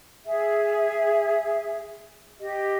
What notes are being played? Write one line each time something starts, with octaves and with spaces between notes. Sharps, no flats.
G#4 E5
G4 D#5